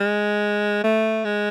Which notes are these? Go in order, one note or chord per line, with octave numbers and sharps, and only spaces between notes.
G#3
A3
G#3